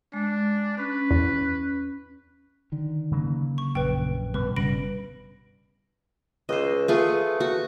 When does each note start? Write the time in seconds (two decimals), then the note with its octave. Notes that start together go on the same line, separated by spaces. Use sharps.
0.13 G#3 D4
0.78 C#4 B4
1.11 E2
2.72 D3 D#3
3.11 C#3 F#3 A#3
3.58 C#6
3.75 A#1 F#2 B4 G5
4.34 B2 G3 B4
4.56 G1 G2 C#3 B5 A#6 D7
6.49 C#2 C5 D#5
6.88 A3 F4 G#4 B4
7.40 F#4